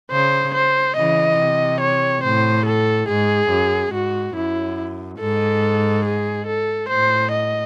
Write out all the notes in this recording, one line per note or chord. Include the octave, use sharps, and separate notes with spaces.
C#3 C5
C5
C#3 E3 D#5
C3
C#5
A2 C5
A4
G#2 G#4
F#2
G#2 F#4
F#2 E4
G#2 A4
G#4
A4
A2 C5
D#5